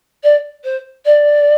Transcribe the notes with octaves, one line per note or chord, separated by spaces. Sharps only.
D5
C5
D5